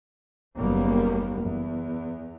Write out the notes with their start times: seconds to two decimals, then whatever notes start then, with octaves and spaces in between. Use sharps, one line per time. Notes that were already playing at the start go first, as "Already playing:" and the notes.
0.56 F#1 D#2 G3 A#3 B3
1.45 E2